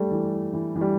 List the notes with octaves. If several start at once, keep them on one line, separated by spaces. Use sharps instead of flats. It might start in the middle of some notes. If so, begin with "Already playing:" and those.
Already playing: G3 A3
E3
E3
E3
G3